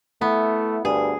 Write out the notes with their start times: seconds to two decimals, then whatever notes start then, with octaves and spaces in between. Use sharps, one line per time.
0.21 A3 B3 E4
0.85 D2 G2 G#4